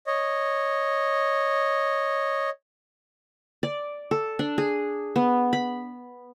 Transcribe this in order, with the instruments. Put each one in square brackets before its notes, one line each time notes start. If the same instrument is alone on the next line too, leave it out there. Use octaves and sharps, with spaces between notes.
[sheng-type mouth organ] C#5 D#5
[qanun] D5
A4
D4
G#4
B3
B5